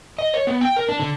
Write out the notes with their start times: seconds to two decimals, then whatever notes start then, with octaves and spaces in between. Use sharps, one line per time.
0.18 D#5
0.34 C#5
0.47 B3
0.61 G5
0.76 A#4
0.89 D4
1.00 D3